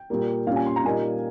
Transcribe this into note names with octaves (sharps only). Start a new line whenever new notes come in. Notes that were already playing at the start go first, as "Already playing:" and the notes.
Already playing: G5
A#2 G3 A#3
A#2 G3 C#4 F5
G#5
C6
A#5
A#2 G3 A#3 D#4 G#5